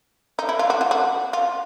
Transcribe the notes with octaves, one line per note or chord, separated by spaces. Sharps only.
D#4
E4
F4
F#4
F4
F#4
F4